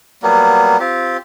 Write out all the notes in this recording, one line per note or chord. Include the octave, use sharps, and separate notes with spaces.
F#3 G3 A#3 B3
C4 F4 G4